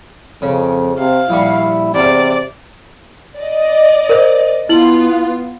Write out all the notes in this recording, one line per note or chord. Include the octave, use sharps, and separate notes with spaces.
F2 C#3
C3 F5
A#1 G3 E4 C#6
E2 C3 A4 D5 F5
D5 D#5
A#4 C5
B3 E4 F4 F#7